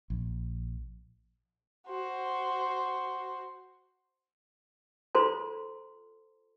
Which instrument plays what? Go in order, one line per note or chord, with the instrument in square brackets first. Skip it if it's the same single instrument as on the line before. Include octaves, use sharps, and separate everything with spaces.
[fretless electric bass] A#1
[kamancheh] F#4 C5
[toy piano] F4 A4 C5 A#5 C6